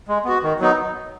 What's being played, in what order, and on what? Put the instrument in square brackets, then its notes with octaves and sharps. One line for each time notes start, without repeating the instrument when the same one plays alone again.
[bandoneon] G#3
B3 F#4
D#3
F#3 B3 D#4